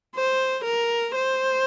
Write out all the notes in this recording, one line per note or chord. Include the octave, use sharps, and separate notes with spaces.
C5
A#4
C5